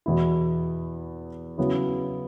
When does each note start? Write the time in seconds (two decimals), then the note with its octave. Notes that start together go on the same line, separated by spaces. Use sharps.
0.06 E2 B2 B3 E4
1.58 C#3 F#3 B3 E4